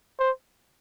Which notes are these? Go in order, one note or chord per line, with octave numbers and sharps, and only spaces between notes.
C5